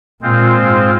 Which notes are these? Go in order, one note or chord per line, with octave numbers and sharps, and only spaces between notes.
A#2 G#3 C4 F4 C5
G#2